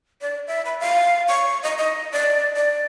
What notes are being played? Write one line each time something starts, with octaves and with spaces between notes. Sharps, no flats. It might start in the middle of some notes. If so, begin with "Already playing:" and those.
D5
E5
B5
F5
C#6
D#5
D#5
D5
D5